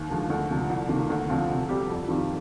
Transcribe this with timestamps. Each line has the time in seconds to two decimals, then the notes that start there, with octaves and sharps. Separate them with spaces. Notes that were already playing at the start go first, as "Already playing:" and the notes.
Already playing: D#2
0.10 D3 F3 G#3
0.30 D2
0.50 C3 F3
0.69 C2
0.89 C3 D#3 A#3 D4
1.10 D2
1.30 D3 F3 C4 F4
1.50 C3
1.69 G3 C4 G4
1.89 F2
2.09 D#3 G3 C4 F4